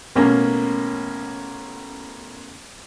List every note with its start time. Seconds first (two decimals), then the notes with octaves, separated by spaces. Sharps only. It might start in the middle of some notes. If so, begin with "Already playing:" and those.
0.16 A1 B2 A#3 C#4 A#5